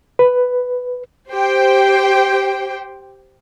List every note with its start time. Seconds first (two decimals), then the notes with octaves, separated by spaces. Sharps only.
0.19 B4
1.29 G4 C5 G5